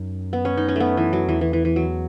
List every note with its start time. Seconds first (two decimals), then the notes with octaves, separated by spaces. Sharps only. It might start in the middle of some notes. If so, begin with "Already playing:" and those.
Already playing: F#2 D#4
0.33 B3
0.45 C#4
0.57 D#4
0.69 C#4
0.76 A3 B3
0.97 E3
1.13 F#3
1.28 E2 E3
1.41 E3
1.53 E3
1.65 E3
1.76 F#3